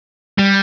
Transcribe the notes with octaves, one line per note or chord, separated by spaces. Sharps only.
G3